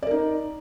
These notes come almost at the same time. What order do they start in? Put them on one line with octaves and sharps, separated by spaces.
D5 A#4 D#4